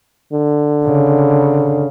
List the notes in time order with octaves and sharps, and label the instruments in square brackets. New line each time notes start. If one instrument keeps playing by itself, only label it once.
[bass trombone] D3
[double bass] C#3